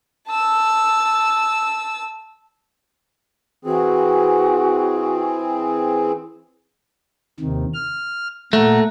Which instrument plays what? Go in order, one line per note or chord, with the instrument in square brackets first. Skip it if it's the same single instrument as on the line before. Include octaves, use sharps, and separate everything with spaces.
[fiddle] A5 E6
[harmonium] E3 C4 G#4 [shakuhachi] F#4
[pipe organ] D#2 C3 D#3
F6
[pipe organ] A#2 F#5 A#5 [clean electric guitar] A3